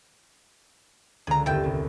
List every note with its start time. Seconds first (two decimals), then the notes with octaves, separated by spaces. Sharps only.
1.27 C#2 D3 G#4 A#5
1.46 G1 D#2 E4 A4 G5
1.64 C2